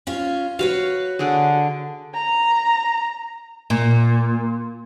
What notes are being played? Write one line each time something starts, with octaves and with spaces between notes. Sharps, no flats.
C#4 F4
F#4 B4 C#5 F5
D3 D4 G#4
A#5
A#2